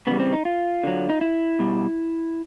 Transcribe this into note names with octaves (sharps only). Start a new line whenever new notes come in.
C#3 E3 G3 B3
C4
D#4
F4
D3 F#3
D#4
E4
B2 G3